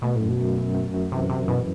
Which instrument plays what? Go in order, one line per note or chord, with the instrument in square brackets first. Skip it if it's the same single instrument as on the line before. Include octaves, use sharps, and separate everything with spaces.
[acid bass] B2 [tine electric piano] A3
[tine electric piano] F#2 [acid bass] A2
[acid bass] B2
[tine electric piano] F#2
F#2
F#2
F#2
[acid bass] C3 [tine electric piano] E3
[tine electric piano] F#2 [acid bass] C3
[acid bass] B2 [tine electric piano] E3